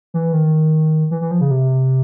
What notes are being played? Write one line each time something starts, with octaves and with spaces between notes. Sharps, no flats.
E3
D#3
E3
E3
F3
C#3
C3